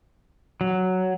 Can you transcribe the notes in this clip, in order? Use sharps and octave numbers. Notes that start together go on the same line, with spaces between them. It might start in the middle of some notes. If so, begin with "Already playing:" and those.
F#3